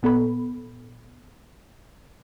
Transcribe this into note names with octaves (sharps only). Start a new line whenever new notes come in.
A#2 B3 A4 B5